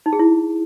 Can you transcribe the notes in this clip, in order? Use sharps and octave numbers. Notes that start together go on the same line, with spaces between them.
D#4
G#4
E4